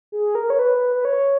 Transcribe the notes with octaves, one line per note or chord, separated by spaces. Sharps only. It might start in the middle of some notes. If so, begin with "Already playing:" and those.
G#4
A#4
C#5
B4
B4
C#5